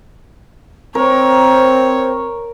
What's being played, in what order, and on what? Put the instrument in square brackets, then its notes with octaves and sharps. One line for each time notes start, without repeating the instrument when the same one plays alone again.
[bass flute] C4 [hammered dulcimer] A#4 [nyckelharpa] C#5